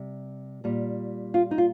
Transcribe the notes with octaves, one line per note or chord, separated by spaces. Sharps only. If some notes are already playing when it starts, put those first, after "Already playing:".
Already playing: C3 G3
A#2 G3
F4
D#4
F4